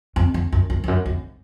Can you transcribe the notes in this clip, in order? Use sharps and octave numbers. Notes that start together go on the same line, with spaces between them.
F2
F2
F#2
F#2
F2
F#2
F2